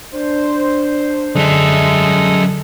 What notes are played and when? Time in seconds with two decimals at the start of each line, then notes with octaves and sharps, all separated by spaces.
0.15 D4 C5
1.35 F#2 D3 G#3 A4 E5 D#6